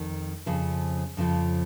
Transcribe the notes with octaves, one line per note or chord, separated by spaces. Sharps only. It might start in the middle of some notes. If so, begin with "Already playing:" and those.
Already playing: F2 D#3 D#4
F2 C#3 F3
F2 C#3 F3